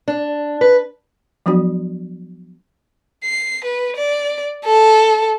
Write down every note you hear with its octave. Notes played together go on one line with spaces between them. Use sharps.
D4
B4
F3 F#3 B3 D4 F#4
C7
B4
D5
A4